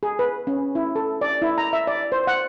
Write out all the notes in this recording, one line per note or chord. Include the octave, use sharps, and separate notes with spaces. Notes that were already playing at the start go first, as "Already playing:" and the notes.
G#4
B4
C#4
E4
A4
D5
E4
A#5
E5
D5
C5
F#5